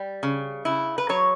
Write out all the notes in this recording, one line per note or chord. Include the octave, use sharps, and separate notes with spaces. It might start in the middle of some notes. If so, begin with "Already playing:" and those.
Already playing: G3
C#3
C#3 E4
B4
F#3 C#5